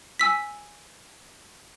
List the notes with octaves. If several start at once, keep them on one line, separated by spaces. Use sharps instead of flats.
G#5 E6 B6